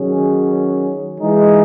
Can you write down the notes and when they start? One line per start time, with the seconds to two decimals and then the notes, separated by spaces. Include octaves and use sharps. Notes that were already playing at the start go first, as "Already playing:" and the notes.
Already playing: D#3 F#3 C#4 G#4
1.18 E3 G#3 D#4 G#4